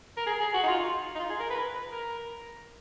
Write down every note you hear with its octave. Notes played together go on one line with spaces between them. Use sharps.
A#4
G#4
G#4
F#4
D#4
F4
D#4
F4
G#4
A#4
B4
B4
A#4